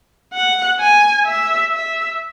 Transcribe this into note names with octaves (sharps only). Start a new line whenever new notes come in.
F#5
G#5
E5
E5